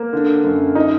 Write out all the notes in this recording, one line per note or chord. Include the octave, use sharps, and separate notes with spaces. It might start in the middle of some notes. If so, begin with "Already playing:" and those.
Already playing: A#3
D3
F#2
D#4